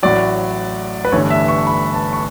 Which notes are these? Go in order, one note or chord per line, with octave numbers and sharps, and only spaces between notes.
A1 A2 F#3 D5
B4
G1 G2 E3 A3 C#5
E5
C#6
B5
A5
C#6